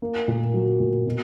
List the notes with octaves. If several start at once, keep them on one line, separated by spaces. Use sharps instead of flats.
A#3
A#2
F#3
A#2
B2